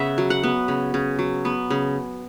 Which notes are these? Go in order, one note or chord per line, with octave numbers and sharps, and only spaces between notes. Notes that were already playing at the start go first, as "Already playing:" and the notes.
Already playing: C#3 B3 E5 F#5
F#3
F#5
B3
C#3
C#3
F#3
B3
C#3